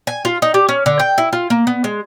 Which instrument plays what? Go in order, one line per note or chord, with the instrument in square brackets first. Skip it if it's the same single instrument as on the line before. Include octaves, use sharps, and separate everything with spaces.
[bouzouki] G#5
F4
D#4
G4
C#4
D3
G5
E4
F4
A#3
B3
G#3